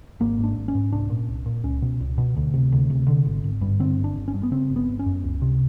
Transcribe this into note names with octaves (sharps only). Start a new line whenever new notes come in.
G#1 A#3
G#2
D4
G#1
C#4
G#2
C2 D4
A#2
C2
A#2
C#2 C#4
B2
C#2
B2
D2
C3
D2
C3
D3
G#1
G#1
G2
D3 C4
G1
D4
G1
C#4
G2
B3
C#3 C4
G1
B3
G1
C#4
F#2
C#2
C3